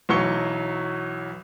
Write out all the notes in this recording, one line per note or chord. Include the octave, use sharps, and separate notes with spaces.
B1 E3 F#3 C#6 C#7 G7